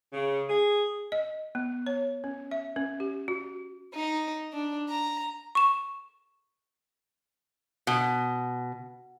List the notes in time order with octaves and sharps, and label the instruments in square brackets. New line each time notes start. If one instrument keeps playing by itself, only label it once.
[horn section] C#3
G#4
[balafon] D#5
B3
C#5
C#4
E5
C#4
G4
F#4
[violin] D#4
D4
A#5
[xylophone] C#6 E7
[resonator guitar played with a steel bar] B2